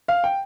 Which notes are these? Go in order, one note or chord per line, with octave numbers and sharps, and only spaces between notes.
F5
G5